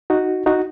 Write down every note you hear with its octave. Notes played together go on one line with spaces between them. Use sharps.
D#4 F#4
D#4 F#4